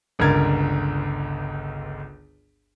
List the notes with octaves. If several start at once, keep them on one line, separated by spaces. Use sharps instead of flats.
G1 C#2 G2 A#4 G#6 A6